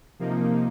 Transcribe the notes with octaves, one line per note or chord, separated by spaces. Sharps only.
C3 F3 A#3 D#4